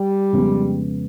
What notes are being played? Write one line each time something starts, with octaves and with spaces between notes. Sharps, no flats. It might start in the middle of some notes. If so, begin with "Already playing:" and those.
Already playing: G3
F2 C#3 F3 G#3 B3